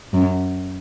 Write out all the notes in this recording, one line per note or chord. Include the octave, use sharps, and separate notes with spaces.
F#2